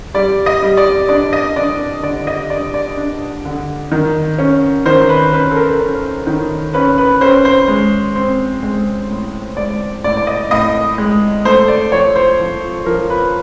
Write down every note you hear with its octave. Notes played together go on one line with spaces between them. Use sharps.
G3 D5
D#5
G3
D5
D4 D5
D#5
D4 D5
D3 D5
D#5
D4 D5
D5
D4
D3
D#3
C#4
D#3 C5
B4
C#4 B4
A4
A#4
C#4
D#3
C#4 B4
B4
C#4 C5
C5
G#3
C4
G#3
A2
G#3 D5
A2 D5
D5
D#5
A2 D#5
G#3
A3 C5
D5
F3 C#5
C5
F3
F3 A#4
B4